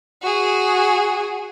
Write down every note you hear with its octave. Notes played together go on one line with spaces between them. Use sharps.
F#4 G#4